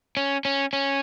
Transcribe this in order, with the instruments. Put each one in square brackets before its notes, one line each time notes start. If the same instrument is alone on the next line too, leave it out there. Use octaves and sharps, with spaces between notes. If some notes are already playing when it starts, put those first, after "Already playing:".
[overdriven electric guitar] C#4
C#4
C#4